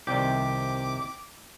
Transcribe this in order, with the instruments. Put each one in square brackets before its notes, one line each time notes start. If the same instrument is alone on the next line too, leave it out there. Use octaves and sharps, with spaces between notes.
[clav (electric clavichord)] C2 C3 D#3 [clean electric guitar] G4 [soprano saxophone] D6